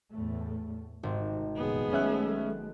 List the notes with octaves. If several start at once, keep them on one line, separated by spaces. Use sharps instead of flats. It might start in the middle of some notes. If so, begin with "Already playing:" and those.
E2 A2 A3
G#1 C3 D#3
F1 F#2 A#2 B3 G#4
F#3 G#3 A3 C#4 E5 F#6